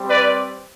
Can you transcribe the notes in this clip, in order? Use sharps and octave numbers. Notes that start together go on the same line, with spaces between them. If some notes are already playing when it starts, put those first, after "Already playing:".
Already playing: G3 C4 G4
B4 D5